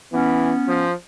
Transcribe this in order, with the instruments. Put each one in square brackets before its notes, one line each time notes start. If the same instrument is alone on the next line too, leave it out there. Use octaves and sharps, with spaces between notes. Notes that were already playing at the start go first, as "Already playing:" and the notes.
[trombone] E3 [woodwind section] B3 C#4
[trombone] F3